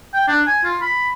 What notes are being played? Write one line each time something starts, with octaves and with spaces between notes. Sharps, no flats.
G5
D4
G#5
F4
B5